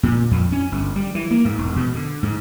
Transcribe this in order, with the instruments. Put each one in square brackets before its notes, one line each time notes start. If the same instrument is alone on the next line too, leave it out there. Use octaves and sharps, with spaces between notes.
[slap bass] A#2
F2
C#4
G1
G3
E3
A#3
G#2
E1
B2
D3
G#2